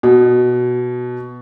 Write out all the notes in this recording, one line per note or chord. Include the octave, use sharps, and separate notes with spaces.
B2